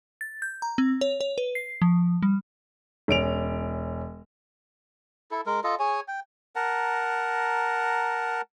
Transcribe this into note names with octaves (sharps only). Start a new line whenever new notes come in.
A6
G6
A#5
C4
C#5
C#5
B4
C7
F3
G3
E1 C#4 D7 F7
E4 A4
G#3 A#4
F4 A4 D#5
G#4 C#5 G#5
G5
A#4 F#5 A5 A#5